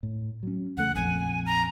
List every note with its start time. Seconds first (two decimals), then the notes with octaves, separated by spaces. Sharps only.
0.03 A2
0.43 F#3 C#4
0.77 E2 C#3 A3 F#5
0.95 A#1 F2 G#5
1.46 A#5